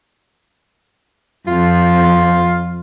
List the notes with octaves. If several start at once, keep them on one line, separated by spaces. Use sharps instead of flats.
F2 F4